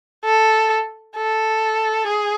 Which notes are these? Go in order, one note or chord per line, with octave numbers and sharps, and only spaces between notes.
A4
A4
G#4